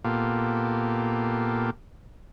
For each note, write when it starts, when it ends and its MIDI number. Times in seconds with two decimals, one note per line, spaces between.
0.04 1.70 46
0.04 1.70 58
0.04 1.70 59
0.04 1.70 65
0.04 1.70 67
0.04 1.70 69